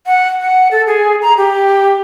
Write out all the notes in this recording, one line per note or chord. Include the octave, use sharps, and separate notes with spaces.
F#5
F#5
A4
G#4
A#5
G4